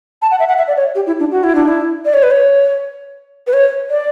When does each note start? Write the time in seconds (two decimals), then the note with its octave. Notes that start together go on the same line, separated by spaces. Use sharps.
0.22 A5
0.31 F#5
0.40 E5
0.48 F#5
0.58 E5
0.68 D5
0.77 C#5
0.95 G4
1.07 E4
1.20 D4
1.31 F#4
1.44 E4
1.55 D4
1.68 E4
2.05 D5
2.14 C#5
2.23 B4
2.31 C#5
3.47 B4
3.53 C#5
3.90 D5